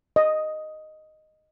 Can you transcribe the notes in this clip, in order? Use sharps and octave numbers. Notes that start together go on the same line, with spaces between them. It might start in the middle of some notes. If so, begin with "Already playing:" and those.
D#5